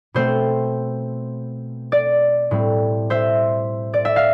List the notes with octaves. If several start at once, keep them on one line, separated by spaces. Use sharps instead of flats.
B2 A3 C4 C5
D5
A2 G3 C4
C5 E5
D5
E5
F5